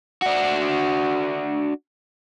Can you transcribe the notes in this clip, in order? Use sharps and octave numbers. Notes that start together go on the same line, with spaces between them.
D4 F#4